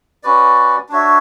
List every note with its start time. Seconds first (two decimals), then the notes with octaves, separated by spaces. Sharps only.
0.23 C#4 F#4 B4 D5
0.89 D4 F#4 C#5 E5